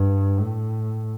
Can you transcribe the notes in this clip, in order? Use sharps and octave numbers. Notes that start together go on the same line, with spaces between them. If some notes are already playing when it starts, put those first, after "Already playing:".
Already playing: G2
A2